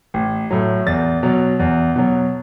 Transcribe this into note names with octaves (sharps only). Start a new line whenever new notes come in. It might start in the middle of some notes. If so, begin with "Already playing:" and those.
A1
A2 F#3
E2 A6
B2 F#3
E2
B2 F#3